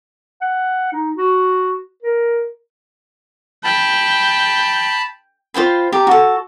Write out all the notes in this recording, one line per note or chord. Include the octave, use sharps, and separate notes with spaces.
F#5
D#4
F#4
A#4
G5 A5 B5
F4 C5 G5 B5
G4 A5 A#5
F#4 A4